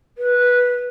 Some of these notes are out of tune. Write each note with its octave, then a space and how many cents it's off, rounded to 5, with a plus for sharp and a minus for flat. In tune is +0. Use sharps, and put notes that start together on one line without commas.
B4 -10